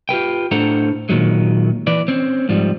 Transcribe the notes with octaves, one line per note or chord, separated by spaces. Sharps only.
F4 G4 B4 G5
A2 D4 A4 C5 F#5 A#5
A#2 D#3 F#3 G#3
E3 B4 D5
C4 C#4
G#2 F3 G3